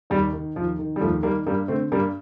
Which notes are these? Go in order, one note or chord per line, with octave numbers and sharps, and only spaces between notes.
D#2 G3
D#3
D#2 F3
D#3
G3
D#2 F3 A3
D#3 G3 A#3
G2 G3 A#3
D3 A3 C4
G2 G3 A#3